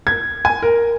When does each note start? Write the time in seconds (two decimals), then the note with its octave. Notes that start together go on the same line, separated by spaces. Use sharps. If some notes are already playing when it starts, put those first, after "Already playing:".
0.07 G#6
0.45 G#5
0.62 A#4